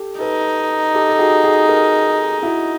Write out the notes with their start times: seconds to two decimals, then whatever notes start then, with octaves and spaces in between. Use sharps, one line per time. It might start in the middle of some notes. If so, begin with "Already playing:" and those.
Already playing: G4 A4
0.20 D#4 A4 B4
0.94 G4 A4
1.09 A4
1.19 F#4 G#4
1.44 F#4 G#4
1.68 G#4 A#4
2.42 E4 F#4